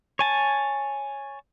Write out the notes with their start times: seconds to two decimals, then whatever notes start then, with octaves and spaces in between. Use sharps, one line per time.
0.19 C#5 G#5 A5